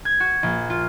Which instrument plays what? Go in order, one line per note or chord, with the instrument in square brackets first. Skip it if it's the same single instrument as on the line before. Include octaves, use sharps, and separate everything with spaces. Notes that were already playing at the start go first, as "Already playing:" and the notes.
[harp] G#6
F#4
A#1
F4